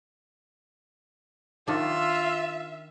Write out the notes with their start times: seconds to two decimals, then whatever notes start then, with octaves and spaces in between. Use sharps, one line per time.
1.68 D#3 D4 F4 E5